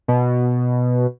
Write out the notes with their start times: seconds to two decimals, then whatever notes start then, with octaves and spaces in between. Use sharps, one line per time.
0.08 B2